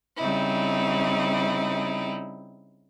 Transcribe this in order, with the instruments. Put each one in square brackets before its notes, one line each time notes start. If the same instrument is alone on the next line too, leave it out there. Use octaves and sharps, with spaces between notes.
[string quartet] C#3 G3 C4 D#4 E4